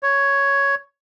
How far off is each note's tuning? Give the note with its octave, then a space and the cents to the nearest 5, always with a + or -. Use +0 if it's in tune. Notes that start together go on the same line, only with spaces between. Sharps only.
C#5 +5